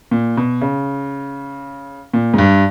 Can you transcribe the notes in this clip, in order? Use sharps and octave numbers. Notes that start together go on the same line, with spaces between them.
A#2
B2
C#3
A#2
G#2
G2